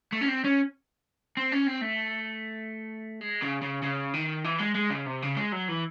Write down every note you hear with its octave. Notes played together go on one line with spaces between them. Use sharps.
A3
C#4
C4
C#4
C4
C#4
C4
A3
G#3
C#3
C#3
C#3
D#3
E3
G#3
G#3
C#3
C3
C#3
G#3
F#3
E3